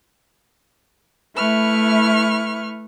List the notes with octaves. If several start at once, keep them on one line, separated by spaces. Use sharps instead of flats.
A3 E4 B4 C#6 F6